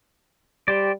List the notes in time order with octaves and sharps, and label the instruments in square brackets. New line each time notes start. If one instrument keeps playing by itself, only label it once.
[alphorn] G3 [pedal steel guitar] G4 C5 D5